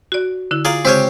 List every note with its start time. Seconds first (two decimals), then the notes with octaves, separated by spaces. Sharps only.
0.12 F#4 D5
0.51 D3 E4
0.65 F4 G#4 D5 F5 A#5
0.85 C#3 G#3 C4 G4 C#5